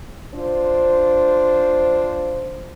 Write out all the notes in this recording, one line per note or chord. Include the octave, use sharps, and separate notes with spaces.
D4 F4 C5